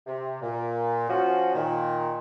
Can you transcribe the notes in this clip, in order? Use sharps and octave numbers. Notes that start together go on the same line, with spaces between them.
C3
A#2
F3 C#4 F#4
A#2 D#3